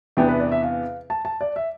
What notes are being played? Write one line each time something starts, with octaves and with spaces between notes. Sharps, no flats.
E2 C3 E3 B3 D4 G5
B4
D5
E5
F5
A5
A5
D5
E5